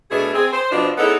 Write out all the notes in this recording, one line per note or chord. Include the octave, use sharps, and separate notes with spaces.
B2 A3 D4 G#4
C4 G#4
C5
B2 F3 D4
G#3 B3 C#4 D#4 E4 A4